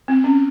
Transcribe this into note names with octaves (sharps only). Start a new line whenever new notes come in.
C4
C#4